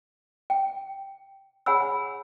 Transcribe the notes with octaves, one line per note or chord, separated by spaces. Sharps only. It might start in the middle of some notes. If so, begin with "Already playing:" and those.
G5
G#4 C#5 F#5 G#5 B5 E6